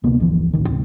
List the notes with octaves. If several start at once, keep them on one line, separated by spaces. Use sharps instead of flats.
D2 C3 A#3 B3
G1 D2 E3 F3
D1 A1 D#3
D2 G#2 C3 C4